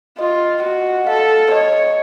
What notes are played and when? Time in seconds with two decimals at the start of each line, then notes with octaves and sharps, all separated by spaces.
0.19 F4 D#5
0.63 F#4
1.07 A4 F5
1.51 C#5 D#5